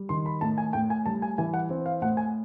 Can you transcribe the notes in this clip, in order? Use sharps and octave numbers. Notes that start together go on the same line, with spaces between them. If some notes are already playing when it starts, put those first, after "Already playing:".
Already playing: G3
D#3 C6
B5
A2 A5
G#5
A2 G5
G#5
G3 A5
G#5
E3 G#5
F#5
C4
F5
A2 F#5
G#5